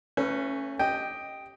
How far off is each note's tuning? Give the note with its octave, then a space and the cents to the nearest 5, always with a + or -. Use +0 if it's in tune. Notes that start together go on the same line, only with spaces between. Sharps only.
A3 +30 C#4 -10 B4 +20
G4 +0 D#5 +0 G5 +0